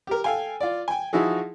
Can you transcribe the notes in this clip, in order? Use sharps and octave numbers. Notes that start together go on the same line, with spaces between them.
G4 A#4
A4 F5 G5 G#5
F4 D5
G5 G#5
F3 D#4 E4 F#4 G#4